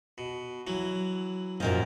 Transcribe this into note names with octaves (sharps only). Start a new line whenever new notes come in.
B2
E3 F#3
F#2 A#2 F3 A#4 D#5